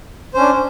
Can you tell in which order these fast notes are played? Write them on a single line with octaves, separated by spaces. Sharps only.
C5 C#4 D4